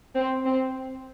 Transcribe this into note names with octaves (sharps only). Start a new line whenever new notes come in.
C4
C4